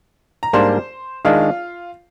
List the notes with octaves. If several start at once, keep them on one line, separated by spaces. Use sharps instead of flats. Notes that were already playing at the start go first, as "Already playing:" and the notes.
A#5
G#2 G3 A#3 D4 C5 C6
D#3 G#3 D4 F4 F5